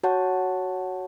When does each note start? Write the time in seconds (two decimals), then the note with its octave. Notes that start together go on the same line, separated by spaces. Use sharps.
0.03 F#4 C#5 F#5 A5